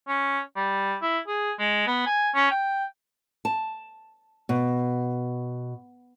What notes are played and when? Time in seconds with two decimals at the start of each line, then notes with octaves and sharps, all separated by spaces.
0.08 C#4
0.56 G3
1.02 E4
1.28 G#4
1.59 G#3
1.87 B3
2.06 G#5
2.35 C#4
2.51 G5
3.45 A5
4.49 B2